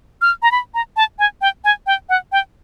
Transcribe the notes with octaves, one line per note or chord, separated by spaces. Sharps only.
F6
A#5
B5
A#5
A5
G#5
G5
G#5
G5
F#5
G5